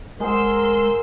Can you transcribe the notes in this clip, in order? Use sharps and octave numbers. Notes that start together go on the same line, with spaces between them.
G#3 G#4 A#4 C5 F#5 C6 E6